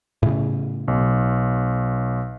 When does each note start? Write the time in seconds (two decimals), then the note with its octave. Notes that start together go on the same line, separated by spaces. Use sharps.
0.23 A2 C#3
0.88 B1